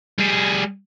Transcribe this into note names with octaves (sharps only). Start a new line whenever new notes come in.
G3 G#4